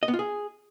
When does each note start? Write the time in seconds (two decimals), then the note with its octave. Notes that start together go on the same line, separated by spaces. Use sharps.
0.03 D#5
0.08 B3
0.14 F4
0.19 G#4